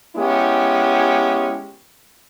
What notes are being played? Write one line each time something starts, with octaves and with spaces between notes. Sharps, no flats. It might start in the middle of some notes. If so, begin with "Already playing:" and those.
G#3 B3 C#4 E4 G4